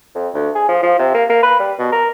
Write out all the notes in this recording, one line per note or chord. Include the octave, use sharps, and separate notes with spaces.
F2
D2
G#4
F3
F3
C3
A#3
A#3
B4
G3
B2
A#4